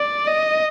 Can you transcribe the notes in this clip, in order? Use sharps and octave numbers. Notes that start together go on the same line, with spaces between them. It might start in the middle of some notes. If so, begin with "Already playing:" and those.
Already playing: D5
D#5